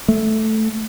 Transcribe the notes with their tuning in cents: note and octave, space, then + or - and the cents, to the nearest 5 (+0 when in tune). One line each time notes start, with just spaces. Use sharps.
A3 -5